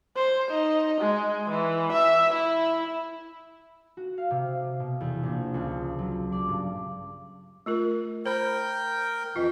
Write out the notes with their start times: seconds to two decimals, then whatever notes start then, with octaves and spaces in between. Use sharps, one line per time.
0.16 C5
0.51 D#4
1.01 G#3
1.49 E3
1.92 E5
2.33 E4
3.97 F#4
4.18 F5
4.31 C3
4.80 B2
5.00 E2
5.23 A#1
5.54 C#2
5.99 F#3
6.32 D5
6.49 G2
7.66 A3 F4 A#4
8.26 A#4 C5 G5 B5
9.36 F2 E3 F4 D#5